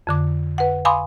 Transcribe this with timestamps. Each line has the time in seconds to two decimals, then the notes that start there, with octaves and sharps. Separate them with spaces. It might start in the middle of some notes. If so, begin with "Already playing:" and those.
0.07 F2 D3 D6
0.58 B4 F#5
0.85 F5 G#5 B5 C6 D6 D#6